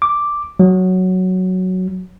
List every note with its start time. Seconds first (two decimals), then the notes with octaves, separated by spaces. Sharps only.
0.02 D6
0.60 F#3